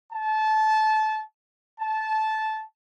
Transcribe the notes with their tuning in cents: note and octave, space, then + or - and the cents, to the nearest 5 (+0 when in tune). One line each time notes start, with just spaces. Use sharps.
A5 -20
A5 -15